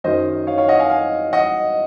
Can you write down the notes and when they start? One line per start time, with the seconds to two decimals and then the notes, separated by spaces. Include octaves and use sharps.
0.04 F#2 D#3 F#3 C5 D#5
0.47 C#5 F5
0.58 C#5 F5
0.68 D#5 F#5
0.79 F5 G#5
0.90 F5 G#5
1.33 D#5 F#5